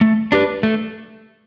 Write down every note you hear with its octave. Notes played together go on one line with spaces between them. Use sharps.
A3
D4 G4 B4
A3